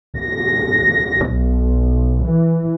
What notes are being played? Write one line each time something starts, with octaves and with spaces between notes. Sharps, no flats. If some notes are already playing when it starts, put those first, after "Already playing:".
A#6
B1
E3